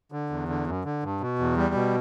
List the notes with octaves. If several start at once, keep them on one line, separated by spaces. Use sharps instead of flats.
D3
E2
D3
F#2
D3
G2
B2
E2
G3
B2